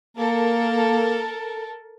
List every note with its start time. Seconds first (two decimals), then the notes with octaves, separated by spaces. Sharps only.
0.17 A#3 A4 A#4